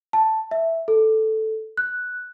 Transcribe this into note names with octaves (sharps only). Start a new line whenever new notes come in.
A5
E5
A4
F#6